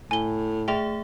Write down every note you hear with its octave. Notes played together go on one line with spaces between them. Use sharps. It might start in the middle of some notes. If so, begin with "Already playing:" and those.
A2 G#5 G7
A3 G#4 E5 G5 F7